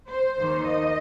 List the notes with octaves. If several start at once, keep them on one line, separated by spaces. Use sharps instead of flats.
C5
D#2 D#3 A#3 D#4
D#5